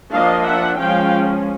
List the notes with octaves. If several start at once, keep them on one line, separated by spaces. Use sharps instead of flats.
F3 A#3 D4 D#5 F5
E5 F#5
F3 G#3 C#4 F5 G5